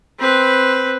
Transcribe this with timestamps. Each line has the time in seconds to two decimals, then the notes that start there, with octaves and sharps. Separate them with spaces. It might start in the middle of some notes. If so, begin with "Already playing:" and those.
0.20 C4 B4